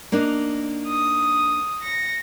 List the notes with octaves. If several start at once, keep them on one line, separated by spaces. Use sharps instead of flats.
A#3 D4 D#4
D#6
A#6 C#7